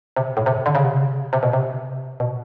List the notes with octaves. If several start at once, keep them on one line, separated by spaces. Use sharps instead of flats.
C3
A2
C3
D3
C#3
C3
C#3
C3
B2
C3
B2